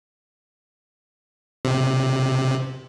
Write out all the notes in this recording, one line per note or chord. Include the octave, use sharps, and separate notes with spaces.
C3